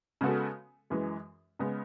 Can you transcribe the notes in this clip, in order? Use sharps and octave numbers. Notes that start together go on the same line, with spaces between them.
C#3 G#3 B3 F#4 A4
F#2 E3 G#3
C#3 G#3 B3